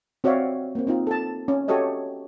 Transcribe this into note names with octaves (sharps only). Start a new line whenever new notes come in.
C4 F#4 C#5 D5 E5 F5
A#3 C4
C4 D#4 F4
A4 A5
C#4
F#4 G4 A4 C#5 D#5 E5